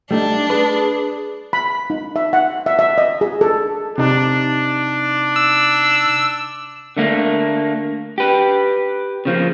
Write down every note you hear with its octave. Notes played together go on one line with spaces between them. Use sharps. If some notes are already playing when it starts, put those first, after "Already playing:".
G3 A3 D4 D#4
G#4 B4
B5
D#4
E5
F#5
E5
E5
D#5
G#4
A4
C3 D4 D#4
E6
D3 A3 A#3
G4 B4
C#3 F3 A#3